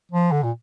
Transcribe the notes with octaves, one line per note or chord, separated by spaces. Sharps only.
F3
D3
A#2